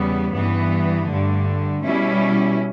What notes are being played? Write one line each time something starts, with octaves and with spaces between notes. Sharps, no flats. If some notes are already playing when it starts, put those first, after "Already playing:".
Already playing: E2 C#3 G3 B3
G2 E3 B3
G2 D3 A3
B2 G3 C#4 E4